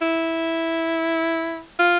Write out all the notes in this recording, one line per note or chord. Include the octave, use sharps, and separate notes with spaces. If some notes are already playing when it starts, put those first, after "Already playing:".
E4
F4